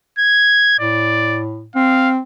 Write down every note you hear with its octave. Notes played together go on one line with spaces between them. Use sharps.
G#6
A2 D5
C4 F5